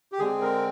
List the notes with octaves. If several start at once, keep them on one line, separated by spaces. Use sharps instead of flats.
G4
D3 G#3 C4 G#4
A#4